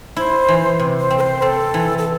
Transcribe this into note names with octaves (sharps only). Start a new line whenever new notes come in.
E4 C5
E3
C3
C5
C4
A4
C5
C4 A4
E3
A4